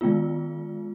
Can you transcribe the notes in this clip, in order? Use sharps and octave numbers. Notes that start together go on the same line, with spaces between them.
D#3 G#3 B3 F4